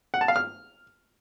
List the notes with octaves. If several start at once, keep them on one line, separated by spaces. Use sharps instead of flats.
F#5
A5
F5
F6